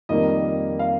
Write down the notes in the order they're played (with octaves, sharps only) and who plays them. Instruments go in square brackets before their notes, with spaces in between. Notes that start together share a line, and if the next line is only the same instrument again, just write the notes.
[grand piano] F2 D#3 G3 A#3 D#5
F5